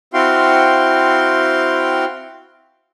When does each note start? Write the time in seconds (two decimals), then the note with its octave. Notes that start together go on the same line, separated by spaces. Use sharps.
0.14 C4 E4 F#4 F5 G5 C6